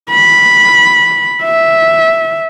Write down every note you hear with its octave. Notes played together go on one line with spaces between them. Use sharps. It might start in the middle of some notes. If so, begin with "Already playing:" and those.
B5
E5